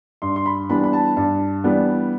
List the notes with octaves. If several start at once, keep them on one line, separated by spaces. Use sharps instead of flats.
G2 C6
C6
B5
E3 G3 B3 D4 B5
B5
A5
G2 A5
E3 G3 B3 D4